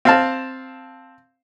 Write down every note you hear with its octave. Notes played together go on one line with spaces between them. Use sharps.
C4 F5 A5